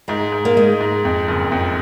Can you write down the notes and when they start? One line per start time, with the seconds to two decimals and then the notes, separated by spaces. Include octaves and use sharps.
0.08 G#2 G#3
0.32 G#2
0.45 A#3
0.57 G#3 D#4
0.81 G#2
1.05 F2
1.28 F#1
1.52 F2